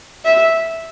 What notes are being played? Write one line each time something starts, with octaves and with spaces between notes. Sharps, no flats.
E5